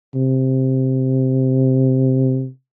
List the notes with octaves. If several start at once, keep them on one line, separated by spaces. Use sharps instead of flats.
C3